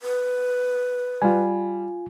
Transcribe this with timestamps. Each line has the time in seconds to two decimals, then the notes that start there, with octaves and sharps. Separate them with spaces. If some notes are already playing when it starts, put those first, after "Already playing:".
0.02 B4
1.22 G3 F4 G#5